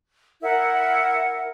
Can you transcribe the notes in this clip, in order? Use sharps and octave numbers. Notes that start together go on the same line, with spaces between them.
E4 A#4 F#5